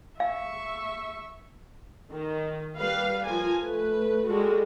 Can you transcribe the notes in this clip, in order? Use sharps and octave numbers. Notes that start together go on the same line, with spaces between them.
E5 F5 C#6
D#3
G3 B4 F5
F3 A#4 G#5
A3 B4
G3 G#3 F#4 A4